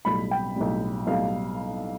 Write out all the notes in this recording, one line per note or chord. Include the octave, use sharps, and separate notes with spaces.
B1 A2 G3 B5
G5
B1 A2 G3
B1 A2 G3 F5